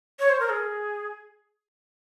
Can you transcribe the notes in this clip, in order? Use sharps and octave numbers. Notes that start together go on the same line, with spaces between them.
C#5
C5
A#4
G#4